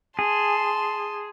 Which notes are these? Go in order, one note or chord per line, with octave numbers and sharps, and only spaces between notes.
G#4 A5 C6